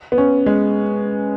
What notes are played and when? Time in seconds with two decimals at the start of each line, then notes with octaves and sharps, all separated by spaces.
0.12 B3
0.18 C#4
0.46 G#3